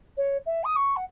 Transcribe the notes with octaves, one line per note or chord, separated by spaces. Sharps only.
C#5
E5
D#6
C#6
F#5